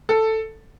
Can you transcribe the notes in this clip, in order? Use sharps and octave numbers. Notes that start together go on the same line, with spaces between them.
A4